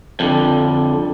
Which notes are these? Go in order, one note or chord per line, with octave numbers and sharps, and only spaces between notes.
F2 D3